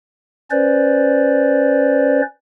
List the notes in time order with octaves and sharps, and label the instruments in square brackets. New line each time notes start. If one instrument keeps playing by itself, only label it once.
[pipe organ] C#4 B4 C5 D5